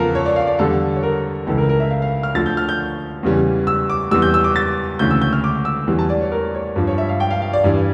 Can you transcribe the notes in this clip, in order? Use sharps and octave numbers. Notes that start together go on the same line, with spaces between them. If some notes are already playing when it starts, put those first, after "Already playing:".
Already playing: E2 C#3 F3 A4 A#4
C#5
D5
F5
D5
E2 D3 G3 A4
C#5
A#4
C#2 C#3 E3 A4
A#4
A#4
E5
F5
F5
F6
D2 D3 F3 A6
G6
F6
G6
E2 C#3 E3 G3
E6
D6
E2 E3 G3 E6
G6
E6
D6
A6
D2 C#3 E3 G6
E6
G6
F6
D6
E6
E2 E3 G3
A5
D5
C#5
A#4
C#5
G2 F3
C#5
E5
F5
G5
F5
F5
D5
G2 E3 G3